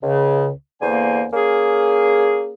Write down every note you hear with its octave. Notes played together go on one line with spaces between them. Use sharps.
C#2 C#3
E2 D3 A#3 C5 G#5
A#3 C#4 G#4